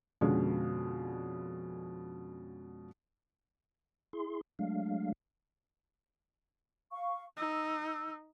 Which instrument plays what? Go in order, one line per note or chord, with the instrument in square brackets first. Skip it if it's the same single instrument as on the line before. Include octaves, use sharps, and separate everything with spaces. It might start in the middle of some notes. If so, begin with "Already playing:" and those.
[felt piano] F2 B2 D3 G#3 C#4
[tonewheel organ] E4 G#4 C6
F#3 G#3 A3 D4 F5
[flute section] F5 C#6
[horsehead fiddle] D#4 [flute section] E6